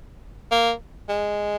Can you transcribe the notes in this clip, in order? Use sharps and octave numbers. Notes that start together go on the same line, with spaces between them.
A#3
G#3